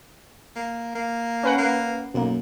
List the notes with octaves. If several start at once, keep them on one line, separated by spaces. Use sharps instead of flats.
A#3
A#3
C#4 B4 F#5
A#3
B1 F#2 A#3